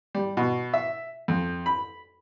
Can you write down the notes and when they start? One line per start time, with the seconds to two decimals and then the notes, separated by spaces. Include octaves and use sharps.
0.15 G3
0.37 B2
0.74 E5
1.28 F2
1.66 B5